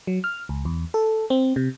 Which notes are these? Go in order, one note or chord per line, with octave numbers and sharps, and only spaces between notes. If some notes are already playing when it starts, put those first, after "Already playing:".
F#3
F6
C#2
E2
A4
C4
C3